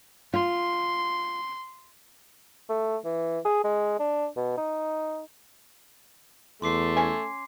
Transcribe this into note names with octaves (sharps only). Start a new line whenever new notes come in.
F4 C6
A3
E3
G#4
G#3
D4
B2
D#4
E2 A3 C6 D6 C7
C#4 G#5